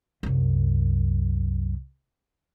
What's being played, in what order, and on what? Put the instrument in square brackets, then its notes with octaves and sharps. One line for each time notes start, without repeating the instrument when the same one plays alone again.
[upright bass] C2 F#2